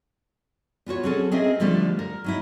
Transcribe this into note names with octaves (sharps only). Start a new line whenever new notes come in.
B3 F4 F#4 C#5
F#3 C4 C#4 G#4 A4
C4 G#4 A#4 D#5 E5
D3 F3 G3 A3 G4
A#4
F#3 D#4 E4